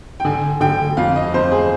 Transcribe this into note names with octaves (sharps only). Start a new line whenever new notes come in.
G5
D3 G#5
D3 G5
F2 F5
D#5
F2 C5
G#4